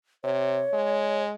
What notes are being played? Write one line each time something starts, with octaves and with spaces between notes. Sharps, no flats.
C3 C#5
G#3